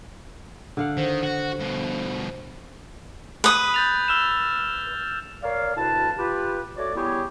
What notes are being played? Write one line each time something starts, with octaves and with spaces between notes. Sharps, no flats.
D3 F5 F#5
D#3 C5
F#4
G2 B2
B4 D#6
G6 A6 F7
E6 F6 E7
A#4 C#5 D5 F5
D2 B2 E4 B4 A5
F4 G4 B4
A3 F#4 C#5 D5
G3 B3 E4 G4 G#4 C#5